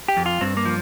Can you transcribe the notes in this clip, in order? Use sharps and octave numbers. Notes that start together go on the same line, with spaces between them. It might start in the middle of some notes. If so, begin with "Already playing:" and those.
G4
F2
F4
G2 C4
A#3
F3